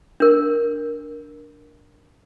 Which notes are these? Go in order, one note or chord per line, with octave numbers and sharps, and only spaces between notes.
D4 A#4